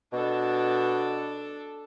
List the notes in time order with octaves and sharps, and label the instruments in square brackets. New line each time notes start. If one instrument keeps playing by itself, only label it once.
[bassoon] B2 [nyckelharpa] D4 A4